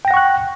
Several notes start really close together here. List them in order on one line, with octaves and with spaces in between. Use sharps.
G5 A#6 F#5 C#6 F#6